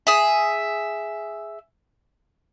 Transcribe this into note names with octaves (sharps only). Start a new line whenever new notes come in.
G#4 E5